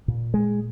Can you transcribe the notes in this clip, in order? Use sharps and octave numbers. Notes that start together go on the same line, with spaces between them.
A#2
G#3